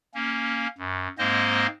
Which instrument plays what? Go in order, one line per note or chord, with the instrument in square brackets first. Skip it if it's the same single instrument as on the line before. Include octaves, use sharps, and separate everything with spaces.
[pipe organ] A#3 C#4
F#2
G#2 G#3 A#3 C4 C5 D#5